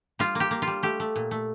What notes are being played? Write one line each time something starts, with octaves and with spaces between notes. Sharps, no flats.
G3 F4
A#3 G4
A#3
F4
G3
A3 G4
A3
A#2
A3